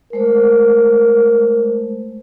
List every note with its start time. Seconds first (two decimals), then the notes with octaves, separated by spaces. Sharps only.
0.13 G#3 A3 A#4 C5